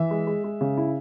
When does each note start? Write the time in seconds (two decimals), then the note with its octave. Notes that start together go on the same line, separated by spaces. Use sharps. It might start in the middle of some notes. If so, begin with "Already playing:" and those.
Already playing: E3 E5
0.11 G#3
0.27 G#3
0.44 G#3
0.61 C#3
0.77 E4